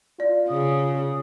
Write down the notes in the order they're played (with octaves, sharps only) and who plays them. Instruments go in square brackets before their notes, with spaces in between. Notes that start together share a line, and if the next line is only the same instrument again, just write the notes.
[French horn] F4 [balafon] D5
[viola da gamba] C#3 [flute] D#6